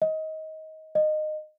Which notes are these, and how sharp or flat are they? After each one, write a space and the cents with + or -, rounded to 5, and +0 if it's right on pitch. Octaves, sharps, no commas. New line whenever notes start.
D#5 +20
D#5 -20